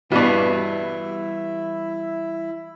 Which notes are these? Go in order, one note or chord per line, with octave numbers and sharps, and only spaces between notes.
G2 B2 E3 G3 B3 E4